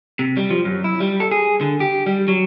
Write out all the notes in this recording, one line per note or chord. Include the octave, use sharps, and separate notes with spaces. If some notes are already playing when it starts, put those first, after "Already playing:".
C3
G3
F3
F#2
E4
G3
A4
G#4
D3
G4
G3
F#3